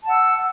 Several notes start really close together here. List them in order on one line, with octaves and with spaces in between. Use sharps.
A5 F#5 E6